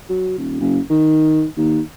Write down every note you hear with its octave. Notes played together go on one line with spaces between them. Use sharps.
F#3
D#1
F#1
D#3
D#2